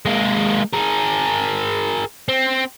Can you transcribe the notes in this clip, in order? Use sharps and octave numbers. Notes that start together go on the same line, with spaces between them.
G#3 A#3
G#4 A#4
C4